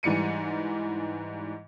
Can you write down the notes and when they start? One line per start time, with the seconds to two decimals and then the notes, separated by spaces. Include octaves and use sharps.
0.03 G#2 E3 G3 C#7 D#7